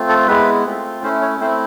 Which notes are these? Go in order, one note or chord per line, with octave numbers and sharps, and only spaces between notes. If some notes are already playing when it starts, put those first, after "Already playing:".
Already playing: A3 C4 F4
A4
G#3 B3 E4 B4
A3 C4 F4
A3 C#4 E4 C5
C#5
A3 C4 E4 C5